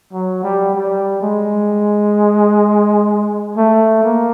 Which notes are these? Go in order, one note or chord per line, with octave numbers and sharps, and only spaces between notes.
F#3
G3
G3
G#3
A3
A#3